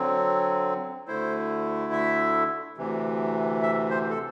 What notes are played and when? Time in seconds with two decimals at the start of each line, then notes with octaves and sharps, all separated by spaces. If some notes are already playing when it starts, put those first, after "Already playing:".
Already playing: D3 F#3 C4
1.08 D2 D3 A3 E4 C5
1.92 E5
2.77 D2 C3 E3
3.63 E5
3.90 C5
4.10 A4